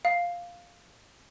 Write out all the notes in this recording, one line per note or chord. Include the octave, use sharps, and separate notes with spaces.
F5